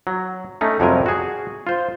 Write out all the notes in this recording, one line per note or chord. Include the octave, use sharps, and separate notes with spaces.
F#3
A3 C#4 D#4
F2 C3 F#3 G3 A#4 G#5
F#4 G#4
F4 C5